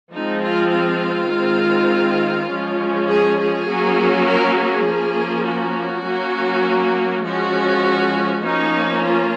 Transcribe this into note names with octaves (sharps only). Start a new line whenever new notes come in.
F3 G#3 C4 D#4
F4
F4
D#3 G#3 C4
F3 G#3 C#4
G#4
G#4
F#3 A#3 C#4
A#4
G#4
F3 A#3 C#4
F#4
F#3 A#3 C#4
F3 G#3 C#4 F#4
F3 A#3 C#4 D#4
F4